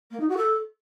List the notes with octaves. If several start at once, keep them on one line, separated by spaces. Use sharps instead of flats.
A#3
D#4
F#4
A4